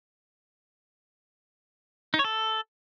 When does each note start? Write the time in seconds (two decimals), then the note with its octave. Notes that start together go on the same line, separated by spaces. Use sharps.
2.14 D#4
2.19 C#5
2.24 A4